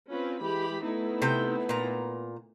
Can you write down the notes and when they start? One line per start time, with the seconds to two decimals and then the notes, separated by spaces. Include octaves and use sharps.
0.11 C4 C#4 F4 B4
0.41 E3 G#3 G4 B5
0.84 A3 B3 D#4 E4
1.22 C3 G5
1.69 A#2 A#5